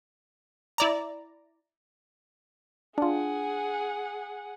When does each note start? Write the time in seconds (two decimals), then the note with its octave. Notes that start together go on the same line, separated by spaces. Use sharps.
0.78 E4 D5 A#5
2.98 D4 F4 G#4 F#5